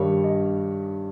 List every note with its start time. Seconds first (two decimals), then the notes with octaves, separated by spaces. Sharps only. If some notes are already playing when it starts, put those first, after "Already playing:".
Already playing: G2 D#3 G3 C#5
0.24 D#5